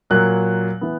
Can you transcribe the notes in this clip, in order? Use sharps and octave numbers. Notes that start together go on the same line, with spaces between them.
A#2 F#3 A#3 F#6
E3 B3